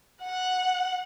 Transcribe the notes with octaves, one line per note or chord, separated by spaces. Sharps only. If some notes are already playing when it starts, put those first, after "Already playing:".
F#5